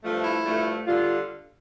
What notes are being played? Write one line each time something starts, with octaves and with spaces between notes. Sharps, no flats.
G2 F3 A3
E4
G2 F3 A3
D3 G3 F4